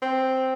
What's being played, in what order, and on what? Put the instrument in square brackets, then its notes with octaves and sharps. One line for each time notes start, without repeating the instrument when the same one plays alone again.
[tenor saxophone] C4